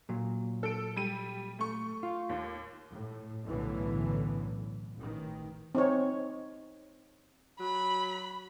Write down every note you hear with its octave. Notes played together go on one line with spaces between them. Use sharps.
A#2 F#3
A4 D7
G3 D#7
A3 C#6
F4
D#2
A2
B1 F#2 A2 D3 E3
A1 D#3
C4 D#4 C#5
F#3 B5